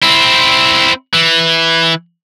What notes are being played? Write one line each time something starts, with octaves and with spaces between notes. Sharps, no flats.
C4 E4
E3